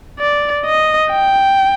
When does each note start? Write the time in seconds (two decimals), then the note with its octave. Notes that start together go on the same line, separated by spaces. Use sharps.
0.19 D5
0.66 D#5
1.11 G5